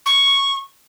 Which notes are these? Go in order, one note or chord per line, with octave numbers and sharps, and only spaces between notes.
C#6